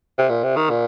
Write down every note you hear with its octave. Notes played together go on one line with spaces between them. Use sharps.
C3
A#2
C3
D#3
A#2